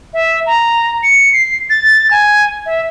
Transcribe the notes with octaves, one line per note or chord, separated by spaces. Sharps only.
E5
A#5
C#7
C7
A6
G#5
E5